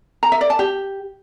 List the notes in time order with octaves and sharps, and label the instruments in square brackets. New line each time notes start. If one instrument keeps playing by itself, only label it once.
[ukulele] A#5
E5
D5
A5
G4